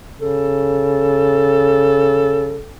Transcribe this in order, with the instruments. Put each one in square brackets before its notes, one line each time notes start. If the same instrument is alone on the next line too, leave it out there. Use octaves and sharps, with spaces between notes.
[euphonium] C#3 [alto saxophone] A4